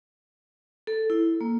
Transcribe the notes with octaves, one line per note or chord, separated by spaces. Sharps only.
A4
E4
A#3